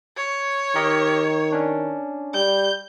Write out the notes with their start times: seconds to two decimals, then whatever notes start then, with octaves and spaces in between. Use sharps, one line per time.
0.17 C#5
0.75 D#3 G4 A#4 D#5
1.52 C#4 D4
2.34 G3 G6